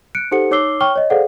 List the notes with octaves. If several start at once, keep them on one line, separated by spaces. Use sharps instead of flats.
F#6 C#7 D7
D#4 G4 A4 C5 F#5 C#7
D#4 C#5 D6 E6 C7 G7
C#5 G5 C#6 F6 G7
C#5 D#5
G#4 A4 C5 D5 F5 F#5